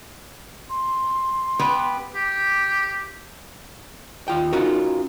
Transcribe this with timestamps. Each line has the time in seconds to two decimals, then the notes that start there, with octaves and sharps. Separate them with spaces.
0.70 C6
1.59 B3 G4 B4
2.15 G4
4.28 D#2 F4 G5
4.52 C#4 D#4 F4 F#4 A#4